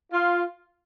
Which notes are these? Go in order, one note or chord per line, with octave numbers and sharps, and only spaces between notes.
F4